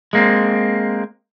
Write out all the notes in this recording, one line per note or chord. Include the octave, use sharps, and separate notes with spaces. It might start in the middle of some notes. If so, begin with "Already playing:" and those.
G#3 A#3 C4